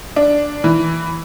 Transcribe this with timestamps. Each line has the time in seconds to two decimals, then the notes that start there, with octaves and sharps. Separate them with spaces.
0.16 D4
0.64 E3